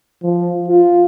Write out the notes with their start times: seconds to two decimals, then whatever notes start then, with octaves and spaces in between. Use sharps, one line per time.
0.23 F3
0.68 F4